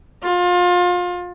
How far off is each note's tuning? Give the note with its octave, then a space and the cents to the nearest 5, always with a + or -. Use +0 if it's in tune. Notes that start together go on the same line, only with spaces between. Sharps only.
F4 +30